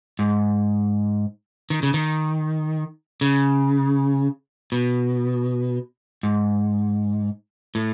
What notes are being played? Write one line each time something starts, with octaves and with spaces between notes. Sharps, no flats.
G#2
D#3
C#3
D#3
C#3
B2
G#2
A2